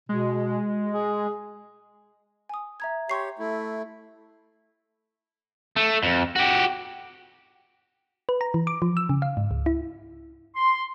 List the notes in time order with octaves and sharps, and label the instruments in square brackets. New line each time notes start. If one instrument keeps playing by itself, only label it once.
[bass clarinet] B2 [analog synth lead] G#3
[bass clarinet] G#4
[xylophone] G#5 D#6
E5 A#5 G#6
[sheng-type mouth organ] G4 C#5 [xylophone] C6 C#6 C7
[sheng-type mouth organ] A3 E4
[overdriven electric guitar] A3
F2
F#4 G4
[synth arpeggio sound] B4
A#5
E3
D6
F3
E6
C#3
F5
G#2
C#2
E4
[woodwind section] C6